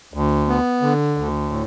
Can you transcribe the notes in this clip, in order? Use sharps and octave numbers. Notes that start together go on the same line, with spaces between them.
D2
B3
D3
D2
A2